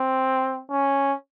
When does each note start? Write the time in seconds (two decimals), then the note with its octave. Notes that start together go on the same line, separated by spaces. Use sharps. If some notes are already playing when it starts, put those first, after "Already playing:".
Already playing: C4
0.71 C#4